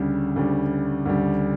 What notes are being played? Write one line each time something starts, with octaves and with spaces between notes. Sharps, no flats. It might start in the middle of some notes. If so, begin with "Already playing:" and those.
Already playing: D2 C#3 G3
D2 C#3 G3
D2 C#3 G3